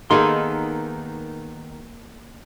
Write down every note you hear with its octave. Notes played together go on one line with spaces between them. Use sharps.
D#3 A#3 B3 D#4 G#4 A4 C6